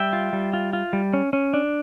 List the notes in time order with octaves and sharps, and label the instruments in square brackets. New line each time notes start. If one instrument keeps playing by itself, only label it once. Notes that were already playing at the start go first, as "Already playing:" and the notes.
Already playing: [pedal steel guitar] G3 E5 G5
F4
G3
F4
F4
G3
C#4
C#4
D4